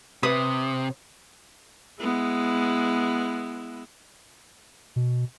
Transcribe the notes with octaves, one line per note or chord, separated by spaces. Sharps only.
C3 B4 D#6
G#3 B3 E4
B2